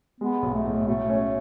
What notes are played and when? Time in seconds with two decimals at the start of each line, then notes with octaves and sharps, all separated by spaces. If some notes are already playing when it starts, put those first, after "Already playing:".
0.20 G#3 B3
0.42 B1
0.54 A3
0.65 A2
0.87 B2 A3
1.10 C#4